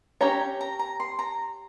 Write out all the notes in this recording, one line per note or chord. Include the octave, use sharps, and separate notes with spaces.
C#4 G4 C#5 A#5
A#5
A#5
C6
A#5